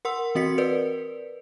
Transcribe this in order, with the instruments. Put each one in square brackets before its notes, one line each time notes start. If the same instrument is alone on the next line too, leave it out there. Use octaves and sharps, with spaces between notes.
[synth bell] A#4 F#5 C6 E6
E3 C4 F#4 D#5 B6 C#7
A#4 B4 D5